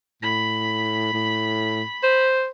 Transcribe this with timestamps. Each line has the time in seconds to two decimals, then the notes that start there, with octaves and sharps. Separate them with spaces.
0.23 A2 B5
1.13 A2
2.04 C5